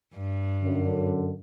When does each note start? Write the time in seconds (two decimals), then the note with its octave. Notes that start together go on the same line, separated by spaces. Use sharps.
0.15 G2
0.63 F#2 D3